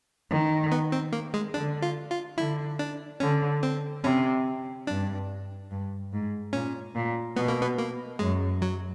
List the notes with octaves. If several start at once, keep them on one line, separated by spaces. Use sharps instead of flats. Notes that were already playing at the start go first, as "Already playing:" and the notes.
D#3
B3
C4
A#3
G#3
D3 D4
F4
F4
D3 E4
D4
D3 C#4
C4
C3 C#4
G2 D4
G2
G#2
A#2 C#4
A#2
B2 B3
A#3
B3
A#3
F#2 G#3
F#3